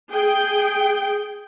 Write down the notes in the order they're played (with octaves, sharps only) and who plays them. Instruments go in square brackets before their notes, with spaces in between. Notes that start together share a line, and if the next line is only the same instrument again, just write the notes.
[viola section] G#4 G5